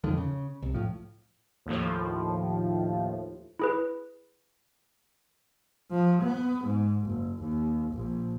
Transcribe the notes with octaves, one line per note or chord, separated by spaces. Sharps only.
D#1 F2 D3 D#3
C#3
C2
A2 F3
D#2 A2 F3
E4 G#4 B4
F3
B3
G#2
F#1
D#2
A#1